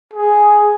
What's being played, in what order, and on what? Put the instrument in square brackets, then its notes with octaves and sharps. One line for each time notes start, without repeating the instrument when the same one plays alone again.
[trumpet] G#4